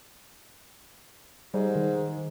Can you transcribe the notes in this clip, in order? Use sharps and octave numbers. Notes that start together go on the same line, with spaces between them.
G#2 G3
D#3